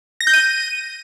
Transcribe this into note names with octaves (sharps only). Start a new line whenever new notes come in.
A#6
G6
D#7